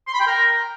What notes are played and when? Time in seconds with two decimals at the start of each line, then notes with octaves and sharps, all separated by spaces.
0.07 C6
0.14 B5
0.20 G5
0.27 A#4